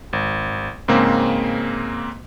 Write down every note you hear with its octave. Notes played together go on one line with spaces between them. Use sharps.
G#1
G#2 C#3 A#3 C4